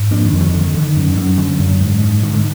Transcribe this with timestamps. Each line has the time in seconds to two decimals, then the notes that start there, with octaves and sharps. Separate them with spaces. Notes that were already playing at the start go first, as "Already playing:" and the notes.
Already playing: G#2
0.11 F2 A#3 D4
0.25 D#3
0.33 F2
0.40 D#3 F#3
0.53 D3 D#3
0.75 D3
0.97 F#2
1.17 F#2
1.37 F#2 D3
1.59 F#2
1.81 G#2
2.01 G#2
2.23 G#2 D#3
2.34 D3